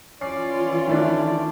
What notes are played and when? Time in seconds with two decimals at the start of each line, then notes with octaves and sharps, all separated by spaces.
0.21 E3 C#4 F4 D5 C7
0.87 D#3 A3 D4